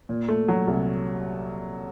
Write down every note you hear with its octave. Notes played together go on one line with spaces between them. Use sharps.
A#2
A3
F#3
C2